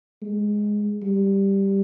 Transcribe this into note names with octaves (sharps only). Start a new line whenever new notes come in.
G#3
G3